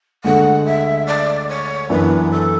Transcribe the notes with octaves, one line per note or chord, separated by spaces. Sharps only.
D2 D3 G#3 F#5
E5
D5
C#5
F#2 E3 B3 D4 B4
A4